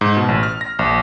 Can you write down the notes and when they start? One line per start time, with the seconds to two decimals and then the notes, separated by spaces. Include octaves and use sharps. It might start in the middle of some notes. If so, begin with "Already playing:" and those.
0.01 G#2
0.17 B2
0.29 A1
0.43 F6
0.61 A#6
0.79 A#1